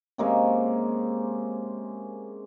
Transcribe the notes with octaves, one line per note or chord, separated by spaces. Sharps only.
C3 G#3 A#3 C#4